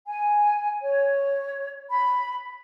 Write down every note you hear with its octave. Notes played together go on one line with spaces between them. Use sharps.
G#5
C#5
B5